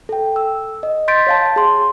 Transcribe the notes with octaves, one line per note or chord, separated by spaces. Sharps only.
A4 G5
E6
D#5
C6 G6 A6 B6 D7
C#5 F5 A5
G#4 C6